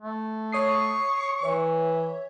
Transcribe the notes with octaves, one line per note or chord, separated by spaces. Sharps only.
A3
C#5 C#6 D#6 C7
E3 C#5 E5